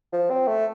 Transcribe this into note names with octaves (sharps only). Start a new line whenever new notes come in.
F3
C4
A3